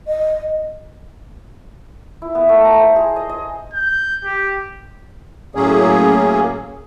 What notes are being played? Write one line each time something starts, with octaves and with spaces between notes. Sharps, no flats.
D#5
E4
B3
A3
A#5
C5
G#4
D#5
D#5
G6
G4
A2 F#3 A#3 C#4 G#4